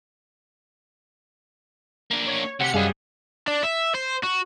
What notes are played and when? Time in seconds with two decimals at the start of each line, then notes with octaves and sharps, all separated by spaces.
2.11 A#3 D4
2.27 C#5
2.60 D2 C3 G4 F#5 C#7
2.74 F#2 G3 G#4 D#5 F5
3.47 D4
3.63 E5
3.95 C5
4.23 F#4